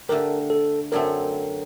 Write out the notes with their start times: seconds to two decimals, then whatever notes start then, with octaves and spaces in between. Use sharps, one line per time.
0.08 D3 A3 D4 G4 A#4
0.50 A4
0.92 F#2 D3 F#3 A3 C4 A#4